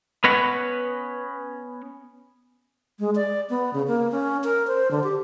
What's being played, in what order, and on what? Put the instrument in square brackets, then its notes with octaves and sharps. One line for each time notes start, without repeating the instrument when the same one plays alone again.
[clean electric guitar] B3 C#4 B4 C#5 D#5 F#5
[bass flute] G#3
D5
B3
C#3
A#3
C#4
A#4
C5
D3
G4